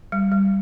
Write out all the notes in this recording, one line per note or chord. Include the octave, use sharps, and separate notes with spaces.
G3
G3